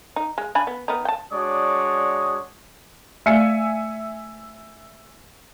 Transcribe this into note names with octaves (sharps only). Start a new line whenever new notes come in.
D#4
G#3
D4 G#5 B5
B3
D#3 B3 D#4
G5 A5
G#3 D4 F#4 C#5 D5 D#6
A3 D5 E5 F5 G#5 C#7